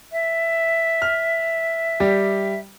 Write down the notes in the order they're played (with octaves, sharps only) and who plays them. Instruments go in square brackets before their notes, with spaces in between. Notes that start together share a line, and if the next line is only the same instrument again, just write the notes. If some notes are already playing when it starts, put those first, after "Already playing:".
[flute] E5
[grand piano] F6
G3 G4